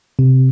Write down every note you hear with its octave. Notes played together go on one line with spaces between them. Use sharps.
C3